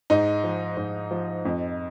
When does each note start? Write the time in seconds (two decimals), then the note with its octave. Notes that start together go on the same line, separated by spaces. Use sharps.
0.10 G#2 D#4
0.44 F3
0.77 G#2
1.11 F3
1.45 F2